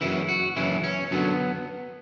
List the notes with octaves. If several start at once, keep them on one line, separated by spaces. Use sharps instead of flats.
F#2 C#3 E3 E4
F#4
F#2 C#3 E3 E4
C#4
F#2 D3 F#3 B3